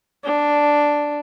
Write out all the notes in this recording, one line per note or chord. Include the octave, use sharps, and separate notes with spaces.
D4